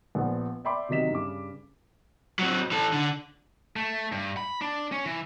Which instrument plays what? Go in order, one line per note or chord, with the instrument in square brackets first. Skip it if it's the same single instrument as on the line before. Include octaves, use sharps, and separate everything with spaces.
[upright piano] A#1 F3 B3 F#5
D5 E5 G5 B5 C6 D6
C3 D#3 F#3 D#5 B6 E7
G2 C#3 D6
[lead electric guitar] F#3 C4
E3 A4
D3
A3
G2
B5
D4
C#4
E3